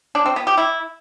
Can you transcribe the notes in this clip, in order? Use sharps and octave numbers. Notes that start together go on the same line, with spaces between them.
D4
C4
B3
G4
E4